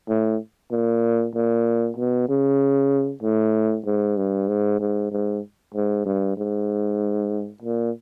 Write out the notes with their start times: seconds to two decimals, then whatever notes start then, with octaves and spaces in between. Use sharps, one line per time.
0.09 A2
0.71 A#2
1.34 A#2
1.97 B2
2.29 C#3
3.22 A2
3.85 G#2
4.17 G2
4.48 G#2
4.80 G#2
5.11 G#2
5.74 G#2
6.05 G2
6.37 G#2
7.62 A#2